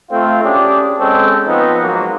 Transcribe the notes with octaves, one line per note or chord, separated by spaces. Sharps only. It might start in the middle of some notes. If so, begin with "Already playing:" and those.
A3 C4 F4
C#4 D4 G4 G#4
G#3 C4 C#4 A4
F3 B3 C4 D#4
G#2 F#3 A#3 F#4